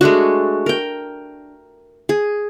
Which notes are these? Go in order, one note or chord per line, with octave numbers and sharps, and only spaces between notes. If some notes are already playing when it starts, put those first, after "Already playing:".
G#3 A3 D4 F#4
A#4 G5
G#4